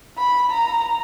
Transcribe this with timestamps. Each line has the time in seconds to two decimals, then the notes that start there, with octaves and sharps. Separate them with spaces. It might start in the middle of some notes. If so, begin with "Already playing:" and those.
0.18 B5
0.50 A#5